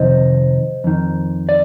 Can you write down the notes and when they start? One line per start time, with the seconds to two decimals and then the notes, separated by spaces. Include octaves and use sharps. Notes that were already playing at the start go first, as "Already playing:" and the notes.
Already playing: F2 C3 D#3 C5 D#5
0.84 F2 D#3
1.49 D5